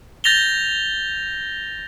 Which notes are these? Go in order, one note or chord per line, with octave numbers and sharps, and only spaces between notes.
G6 A6 A#6 F7 G7